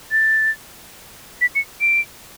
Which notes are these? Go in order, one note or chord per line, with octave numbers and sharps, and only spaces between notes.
A6
B6
C#7
D7